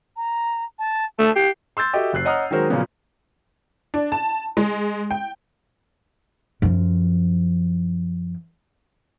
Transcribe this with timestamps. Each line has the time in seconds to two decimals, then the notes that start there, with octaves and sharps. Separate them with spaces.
0.17 A#5
0.79 A5
1.19 A3 A5
1.35 G4 C7
1.77 C6 E6 G6 A6
1.93 F#4 G4 A4 D#5 E5
2.13 F#1 F#6 C7
2.25 C#5 D#5 F#5 A#5 D#6 F6
2.51 D#3 F#3 G#3 F#4 A#4 C5
2.70 A#2 C#3 F3 F#3 A#3 B3
3.94 D4
4.12 A5
4.57 G#3
5.11 G5
6.62 F#2 F3